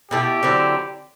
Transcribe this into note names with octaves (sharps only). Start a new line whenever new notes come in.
B2 A3 E4 G4
D3 F#3 C4 E4